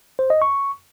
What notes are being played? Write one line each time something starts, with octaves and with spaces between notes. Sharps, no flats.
C5
D#5
C#6